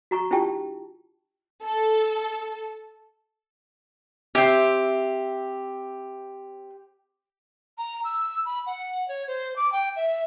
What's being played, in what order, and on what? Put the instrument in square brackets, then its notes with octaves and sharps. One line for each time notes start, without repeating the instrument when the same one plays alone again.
[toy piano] F#4 A#5 C#6
D4 E4 F4 G4 G5 A5
[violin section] A4
[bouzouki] C4 E5 [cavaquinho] G4
[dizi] A#5
E6
B5
F#5
C#5
C5
D6
G5
E5